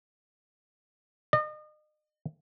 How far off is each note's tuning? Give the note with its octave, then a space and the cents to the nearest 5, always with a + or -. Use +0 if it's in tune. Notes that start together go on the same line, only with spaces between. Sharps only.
D#5 -35